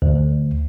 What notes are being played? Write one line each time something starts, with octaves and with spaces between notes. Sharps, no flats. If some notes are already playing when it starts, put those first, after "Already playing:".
D2